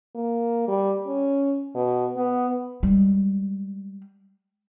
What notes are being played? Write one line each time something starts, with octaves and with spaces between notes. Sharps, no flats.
A#3
G3
C#4
B2
B3
G3 G#3